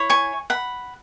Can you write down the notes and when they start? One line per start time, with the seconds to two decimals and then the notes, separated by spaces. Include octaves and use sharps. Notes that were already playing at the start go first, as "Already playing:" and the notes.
Already playing: E4 C#5
0.10 G#5 C#6
0.50 F#5 B5